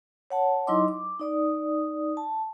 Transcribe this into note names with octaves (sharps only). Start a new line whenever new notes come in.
C#5 F#5 A5
F#3 D#4 E4 D#5 C6 D6
D6
D#4 D5 D#6
A5